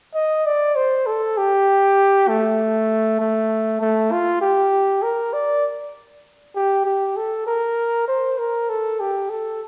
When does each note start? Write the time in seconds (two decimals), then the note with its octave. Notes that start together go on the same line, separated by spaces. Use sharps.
0.14 D#5
0.46 D5
0.76 C5
1.06 A4
1.37 G4
2.28 A3
3.20 A3
3.81 A3
4.12 F4
4.41 G4
5.02 A#4
5.33 D5
6.56 G4
6.85 G4
7.17 A4
7.46 A#4
8.08 C5
8.38 A#4
8.69 A4
9.00 G4
9.30 A4